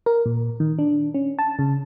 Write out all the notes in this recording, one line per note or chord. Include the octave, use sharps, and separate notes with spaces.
A#4
A#2
D#3
D4
C#4
A5
C#3